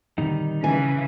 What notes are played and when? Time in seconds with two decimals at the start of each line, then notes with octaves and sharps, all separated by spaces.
0.18 A#2 D3 D#3 G3 C4 D#4
0.64 C#3 E3 G#5